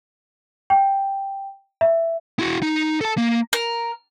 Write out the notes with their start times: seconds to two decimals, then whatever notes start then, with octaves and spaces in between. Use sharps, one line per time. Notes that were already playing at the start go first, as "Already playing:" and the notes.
0.70 G5
1.81 E5
2.39 E4 F#4
2.62 D#4
3.01 A4 A5
3.17 A#3
3.53 A#4